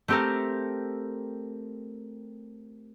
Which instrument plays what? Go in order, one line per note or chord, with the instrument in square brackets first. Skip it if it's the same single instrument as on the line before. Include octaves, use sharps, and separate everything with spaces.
[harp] A3 C4 G4 A4 A#4